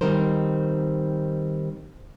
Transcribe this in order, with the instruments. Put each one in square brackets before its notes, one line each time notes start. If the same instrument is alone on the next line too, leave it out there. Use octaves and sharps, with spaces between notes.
[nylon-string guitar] D#3 G3 C4 D#4 A#4 C5